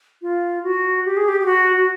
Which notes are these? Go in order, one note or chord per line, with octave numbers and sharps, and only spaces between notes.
F4
F#4
G4
G#4
G4
G4
F#4
F#4